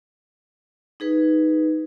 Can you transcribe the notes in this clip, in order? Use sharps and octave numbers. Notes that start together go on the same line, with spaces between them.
D#4 G#4 B4